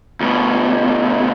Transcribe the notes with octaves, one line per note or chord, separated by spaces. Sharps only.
D2 B2